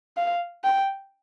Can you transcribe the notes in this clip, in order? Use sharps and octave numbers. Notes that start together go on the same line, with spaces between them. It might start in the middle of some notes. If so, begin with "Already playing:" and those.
F5
G5